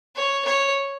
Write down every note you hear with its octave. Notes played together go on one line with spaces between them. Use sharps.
C#5
C#5